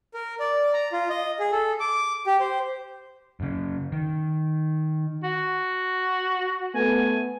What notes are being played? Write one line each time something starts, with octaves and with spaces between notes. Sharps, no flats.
A#4
D5
A#5
F4
D#5
G#4
A4
D6
G4
C5
F#2 C#3
D#3
F#4
A3 B3 G#5